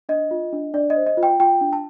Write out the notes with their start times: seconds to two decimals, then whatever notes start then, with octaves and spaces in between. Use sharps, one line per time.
0.09 D4 D#5
0.31 F4
0.53 D4
0.74 D4 D5
0.90 D#5
0.96 C5
1.07 D#5
1.17 F4
1.23 G5
1.39 F4 G5
1.61 D4
1.73 A5